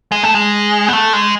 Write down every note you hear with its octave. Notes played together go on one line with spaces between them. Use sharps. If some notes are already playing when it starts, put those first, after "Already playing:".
G#3
A3
G#3
B3
A3
G#3